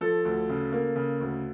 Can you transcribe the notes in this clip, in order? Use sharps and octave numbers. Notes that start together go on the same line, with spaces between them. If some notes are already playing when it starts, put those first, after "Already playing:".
F3 A4
D2
C#3
A#3
C#3
D2